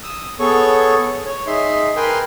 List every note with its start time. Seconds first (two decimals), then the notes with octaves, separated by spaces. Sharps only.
0.03 D#6 E6
0.40 B3 G#4 A4 C#5 C#6
1.26 C#5
1.47 D#4 G#4 E5 C6
1.96 A#4 B4 G5 G#5 C6